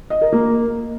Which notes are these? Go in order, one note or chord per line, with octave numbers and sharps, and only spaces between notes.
D#5
A#4
A#3